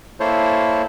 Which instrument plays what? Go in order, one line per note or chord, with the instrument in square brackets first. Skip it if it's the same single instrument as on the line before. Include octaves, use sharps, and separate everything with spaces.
[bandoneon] A#3 E4 A4 C5 C#5